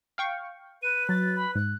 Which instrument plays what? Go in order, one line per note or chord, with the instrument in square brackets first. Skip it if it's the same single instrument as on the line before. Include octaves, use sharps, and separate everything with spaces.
[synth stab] F5 G5 C#6
[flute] B4 [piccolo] D#7
[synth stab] F#3 [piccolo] A6
[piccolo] B5
[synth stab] G#2 [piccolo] F#6